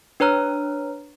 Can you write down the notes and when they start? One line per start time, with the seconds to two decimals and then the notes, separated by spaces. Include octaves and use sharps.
0.20 D4 B4 C#5 A#5 F6